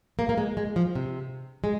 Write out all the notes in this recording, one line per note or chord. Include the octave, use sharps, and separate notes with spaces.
A#3
A#3
G#3
G#3
F3
C3
G#3